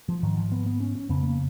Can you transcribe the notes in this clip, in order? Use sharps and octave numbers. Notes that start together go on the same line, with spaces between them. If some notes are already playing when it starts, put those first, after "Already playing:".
F3
G#2 D#3
F3
B3
B3
C#4
C#4
F2 C#3 B3
A#3